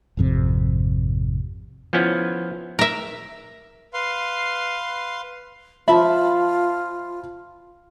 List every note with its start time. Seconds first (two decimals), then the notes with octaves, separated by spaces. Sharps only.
0.17 G#1 F2 C3
1.93 F3 B3 C#4 E4
2.79 A#4 E5
3.94 B4 F5 C6
5.88 F3 F4 E5 A5 B5